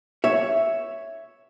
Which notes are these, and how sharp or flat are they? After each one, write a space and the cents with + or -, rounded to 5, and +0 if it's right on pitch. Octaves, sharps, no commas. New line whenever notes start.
C#5 +0 E5 +0